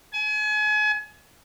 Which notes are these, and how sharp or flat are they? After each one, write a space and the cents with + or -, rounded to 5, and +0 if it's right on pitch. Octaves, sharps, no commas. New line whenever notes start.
G#5 +35